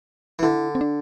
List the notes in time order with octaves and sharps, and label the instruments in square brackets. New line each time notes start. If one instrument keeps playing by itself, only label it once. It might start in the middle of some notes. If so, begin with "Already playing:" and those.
[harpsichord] E3
[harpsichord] D3 [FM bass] E4
[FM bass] C4
D4